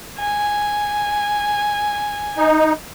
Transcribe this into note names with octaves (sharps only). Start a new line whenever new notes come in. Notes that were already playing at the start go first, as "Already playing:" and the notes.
G#5
D#4